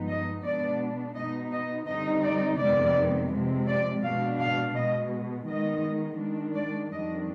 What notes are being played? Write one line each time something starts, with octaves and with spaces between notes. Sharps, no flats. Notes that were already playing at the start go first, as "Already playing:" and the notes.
Already playing: G2 F3 G#3 B3 D#4
D#5
B2 G#3 B3 D4 D5
B2 B3 D#4 D#5
D#5
D3 G3 C4 D#4 D#5
D5
F2 C3 D#3 G#3 B3 D5
C3 F3 G#3
D5
B2 G#3 D4 F5
F5
B2 G#3 B3 D#5
D#3 G#3 B3 D#4 D#5
D#3 G#3 D4
D5
F2 D#3 G3 D4 D#5